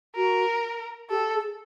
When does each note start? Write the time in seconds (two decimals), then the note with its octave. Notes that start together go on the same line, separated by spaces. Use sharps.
0.16 F#4 A#4
1.10 G4 A4
1.34 G#4